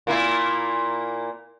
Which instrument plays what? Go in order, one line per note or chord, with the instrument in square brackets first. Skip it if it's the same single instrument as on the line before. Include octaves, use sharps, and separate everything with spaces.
[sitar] A#2 A#3 E4